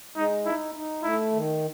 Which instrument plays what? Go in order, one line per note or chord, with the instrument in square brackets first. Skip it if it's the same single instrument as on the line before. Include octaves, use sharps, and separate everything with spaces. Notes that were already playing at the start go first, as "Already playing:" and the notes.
[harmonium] G#3 [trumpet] D#4
[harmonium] D#4 [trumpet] E4
[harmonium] D#4
[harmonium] A3 [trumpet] E4
[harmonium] D#3